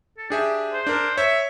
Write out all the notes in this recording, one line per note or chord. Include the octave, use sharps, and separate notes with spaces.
A4
D4 G4 G#4 E5
C5
D4 A#4
C#5 E5